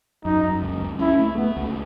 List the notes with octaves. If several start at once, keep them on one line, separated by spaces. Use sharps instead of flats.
F#2 D#4
F#2
C#2
C#2
C#4 E4
A3
A3 B3
C#2